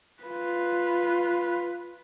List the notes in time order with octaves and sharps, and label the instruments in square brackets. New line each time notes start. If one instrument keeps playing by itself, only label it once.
[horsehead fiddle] F4 B4